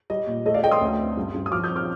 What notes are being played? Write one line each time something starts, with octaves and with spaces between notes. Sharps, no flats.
G3 D#5
A#2
A3 D#5
D5 F5
A3 D#5 G5
C6 D#6
D2
C4
G2
G2
D#6
F3 D6 F6
D#6 G6
C4
D6 F6